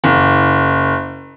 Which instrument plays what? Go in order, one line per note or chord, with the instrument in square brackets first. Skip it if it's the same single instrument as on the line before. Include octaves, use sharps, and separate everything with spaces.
[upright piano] F#1